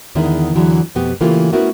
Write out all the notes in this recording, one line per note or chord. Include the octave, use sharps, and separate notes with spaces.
E2 D3 D#3 G#3 B3 E4
E2 D3 E3 F#3 G#3
F2 B2 B3 G4
C#3 E3 A3 A#3 F4 G4
A3 B3 C#4 E4 F#4 A#4